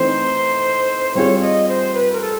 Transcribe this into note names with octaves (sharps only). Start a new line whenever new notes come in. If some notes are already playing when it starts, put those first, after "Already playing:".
Already playing: E3 A3 C4 D#4 C5
G3 C4 F4 G#4 C#5
D5
D#5
C5
B4
A#4
A4